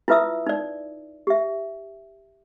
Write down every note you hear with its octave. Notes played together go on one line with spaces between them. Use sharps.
E4 F4 B4 E5 D#6 E6
D#4 D5
G4 E5